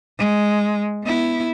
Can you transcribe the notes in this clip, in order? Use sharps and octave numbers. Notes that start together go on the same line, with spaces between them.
G#3
B3 E4